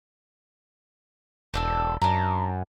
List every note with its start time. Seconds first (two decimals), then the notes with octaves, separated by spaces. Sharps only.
1.54 E1 C4 D4 A4
2.02 F#2 D4 A#5